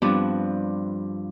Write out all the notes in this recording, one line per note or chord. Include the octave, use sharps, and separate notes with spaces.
G2 F3 B3 C4 D4